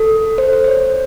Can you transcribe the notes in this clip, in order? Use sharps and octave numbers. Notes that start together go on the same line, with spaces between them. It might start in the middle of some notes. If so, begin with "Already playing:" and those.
Already playing: A4
C5
C5
C5
C#5